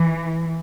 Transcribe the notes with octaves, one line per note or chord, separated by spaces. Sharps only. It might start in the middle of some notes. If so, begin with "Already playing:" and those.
Already playing: E3